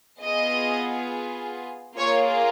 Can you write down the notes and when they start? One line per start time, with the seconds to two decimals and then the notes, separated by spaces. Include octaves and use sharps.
0.22 B3 F4 G#4 D#5
1.97 A#3 F4 G#4 C#5